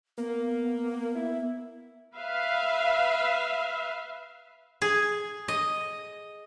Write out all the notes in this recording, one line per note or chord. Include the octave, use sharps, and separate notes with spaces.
A#3 B3
E4
B4 E5 F5
G#4
D#5